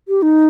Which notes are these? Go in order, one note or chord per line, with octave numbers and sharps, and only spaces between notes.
G4
D#4